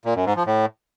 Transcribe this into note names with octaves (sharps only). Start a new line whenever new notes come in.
A#2
F#2
G#2
F3
A2